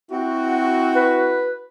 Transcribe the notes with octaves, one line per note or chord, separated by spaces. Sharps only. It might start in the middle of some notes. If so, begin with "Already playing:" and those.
C4 E4 F#4
B4